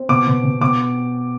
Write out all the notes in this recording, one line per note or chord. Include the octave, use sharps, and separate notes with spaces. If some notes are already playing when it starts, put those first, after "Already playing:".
Already playing: C4
B2 D6
B2
B2
B2 D6